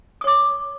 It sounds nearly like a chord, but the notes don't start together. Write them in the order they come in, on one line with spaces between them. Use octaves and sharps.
D#6 C#5 D6